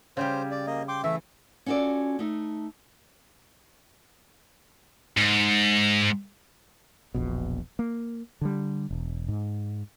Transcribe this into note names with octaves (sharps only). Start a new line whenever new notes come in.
C#3 G3 G4 C5
D5
A#3 D#5
G5 C6 D6
E3 A3 E5
C#4 F4 F#4 A4 D5
A3 D#4
G#2
E1 A#1 B2
A#3
D3 G3
E1
G#2